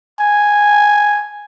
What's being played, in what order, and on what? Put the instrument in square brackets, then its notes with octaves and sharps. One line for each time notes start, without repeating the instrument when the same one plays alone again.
[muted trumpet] G#5